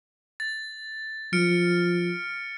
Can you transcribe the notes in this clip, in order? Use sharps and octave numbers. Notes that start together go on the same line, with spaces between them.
A6
F3 F6 C#7 D7